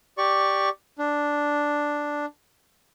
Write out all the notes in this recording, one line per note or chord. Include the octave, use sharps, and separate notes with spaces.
G4 D5 C#6
D4